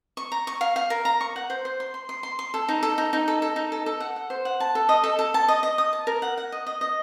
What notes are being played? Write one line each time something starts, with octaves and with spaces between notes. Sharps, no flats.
C#6
A#5
C#6
F5
F5
A#4
A#5
C#6
F#5
C5
C5
C6
C6
C6
C6
C6
A4
D#4
A4
D#4
D#4
A4
A4
D#4
A4
A4
F#5
F#5
C5
F#5
A5
A4
D#5
A4
A4
A5
D#5
D#5
D#6
A5
A#4
F#5
F#5
D#5
D#5
D#5